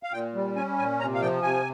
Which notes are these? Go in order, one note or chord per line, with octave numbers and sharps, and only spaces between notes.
F5
A#2 G5
G3
C#4 G#5
A#2 G#5
C3 A#5
F5
F3 G5
C3 G#5